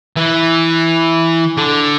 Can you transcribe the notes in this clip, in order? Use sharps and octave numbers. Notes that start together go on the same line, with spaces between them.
E3
D3